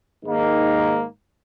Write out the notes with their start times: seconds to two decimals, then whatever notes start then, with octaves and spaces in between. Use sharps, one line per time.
0.24 G#2 D#3 A#3